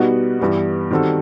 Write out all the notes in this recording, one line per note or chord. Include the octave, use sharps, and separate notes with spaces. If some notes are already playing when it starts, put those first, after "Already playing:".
Already playing: B2 G3 B3 D#4 F#4
G2 E3 G3 B3
D#3 G3 C4 F#4 A4